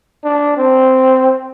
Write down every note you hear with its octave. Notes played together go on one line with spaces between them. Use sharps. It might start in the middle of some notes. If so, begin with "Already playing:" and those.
D4
C4